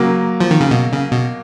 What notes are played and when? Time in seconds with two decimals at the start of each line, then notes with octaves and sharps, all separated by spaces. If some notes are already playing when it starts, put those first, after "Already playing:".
Already playing: C#3 F#3 A#3
0.40 F3
0.51 D#3
0.61 C#3
0.71 B2
0.92 C#3
1.12 B2